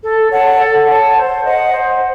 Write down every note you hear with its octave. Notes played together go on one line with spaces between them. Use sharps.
A4
C#5 F#5 A5
A4
C#5 F#5 A5
C5
D#5 F#5
C5